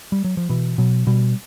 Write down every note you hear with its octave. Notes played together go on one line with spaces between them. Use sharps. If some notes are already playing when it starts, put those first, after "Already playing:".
G3
F#3
F3
B2 E3
B2 F#3
B2 G3